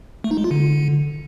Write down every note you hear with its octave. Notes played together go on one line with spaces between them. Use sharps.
A3
D#4
G#3
F4
D3